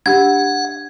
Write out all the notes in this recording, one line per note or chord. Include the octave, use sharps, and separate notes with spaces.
D4 G4 F#5 G#6